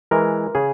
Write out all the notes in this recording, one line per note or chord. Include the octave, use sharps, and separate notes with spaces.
E3 G#3 A#4
C#3 G#4